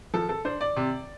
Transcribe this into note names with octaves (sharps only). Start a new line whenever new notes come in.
F3 A4
A4
D4 C5
D5
C3